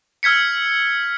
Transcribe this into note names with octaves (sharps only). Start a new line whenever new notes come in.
E6 F6 G#6 B6 C#7